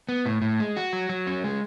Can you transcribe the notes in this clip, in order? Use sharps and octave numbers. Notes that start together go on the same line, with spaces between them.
B3
A2
A2
G#3
F#4
F#3
F#3
C#4
G#3